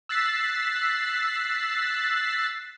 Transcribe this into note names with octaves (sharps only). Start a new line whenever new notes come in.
E6 F#6 A6 B6 C7